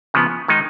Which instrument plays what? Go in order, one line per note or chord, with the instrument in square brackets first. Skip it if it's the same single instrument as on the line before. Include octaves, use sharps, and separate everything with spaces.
[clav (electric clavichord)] C#3 F3 B3
D#3 G#3 D#4